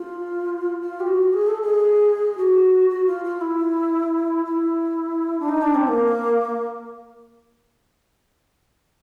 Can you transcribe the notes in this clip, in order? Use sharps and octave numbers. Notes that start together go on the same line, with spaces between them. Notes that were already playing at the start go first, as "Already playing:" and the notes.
Already playing: F4
F4
G4
F#4
G#4
A4
G#4
F#4
F#4
F4
F4
E4
E4
D4
D#4
D4
C4
A#3